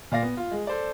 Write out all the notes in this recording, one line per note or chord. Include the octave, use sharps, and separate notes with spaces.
A#2 D5 F5 A#6
B3
F4
G#3
A4 C5 D5